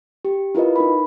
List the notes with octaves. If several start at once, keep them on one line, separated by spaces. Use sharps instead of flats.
G4
E4 F4 A#4 B4 D#5
D#4 A#4 B5